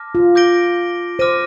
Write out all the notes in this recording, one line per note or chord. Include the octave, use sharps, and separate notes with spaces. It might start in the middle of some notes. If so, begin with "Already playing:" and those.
Already playing: A5 D6 F6 A#6
F4
D6 G6 A#6 D7 G7
C5 D6 F6 A#6 D#7